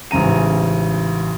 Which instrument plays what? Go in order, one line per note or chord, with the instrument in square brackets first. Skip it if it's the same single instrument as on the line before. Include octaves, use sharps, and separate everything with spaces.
[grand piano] A1 G#2 C#3 A#5 D#7